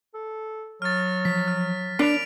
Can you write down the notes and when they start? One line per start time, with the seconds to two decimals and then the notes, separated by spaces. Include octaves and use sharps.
0.14 A4
0.82 F#3 F6 A6
1.25 F3 B6
1.48 F6
1.99 D4 A#4 C#5 B5 B6 D7 F7